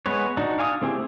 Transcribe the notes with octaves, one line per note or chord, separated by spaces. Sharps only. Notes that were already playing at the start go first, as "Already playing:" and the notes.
G#3 B3 G#4 B4 C#5
D4 D#4 F#4
D5 F5 G#5 C#6 D#6
A3 C4 E4 G4 G#4